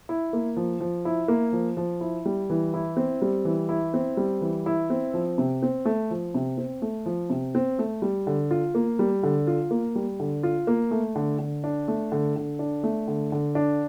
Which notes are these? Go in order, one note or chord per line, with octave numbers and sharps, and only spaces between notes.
E4
A#3
F3
F3
E4
A#3
F3
F3
E4
G3
E3
E4
C4
G3
E3
E4
C4
G3
E3
E4
C4
F3
C3
C4
A3
F3
C3
C4
A3
F3
C3
C4
A3
G3
D3
F4
A#3
G3
D3
F4
A#3
G3
D3
F4
A#3
A3
D3
D3
D4
A3
D3
D3
D4
A3
D3
D3
D4